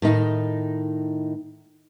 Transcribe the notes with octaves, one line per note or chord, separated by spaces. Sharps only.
A2 D#3 D#4